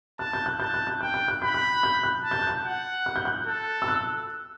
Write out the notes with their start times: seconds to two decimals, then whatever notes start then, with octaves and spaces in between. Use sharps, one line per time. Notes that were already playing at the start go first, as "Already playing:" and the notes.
0.19 A5 F#6
0.33 G6
0.46 F#6
0.60 A5 G6
0.74 F#6
0.87 G6
1.01 G5 F#6
1.14 G6
1.28 F#6
1.42 B5 G6
1.54 F#6
1.83 G6
2.03 F#6
2.24 A5
2.31 G6
2.39 F#6
2.47 G6
2.65 F#5
3.06 F#6
3.16 G6
3.25 F#6
3.47 A4
3.82 E6
3.88 F#6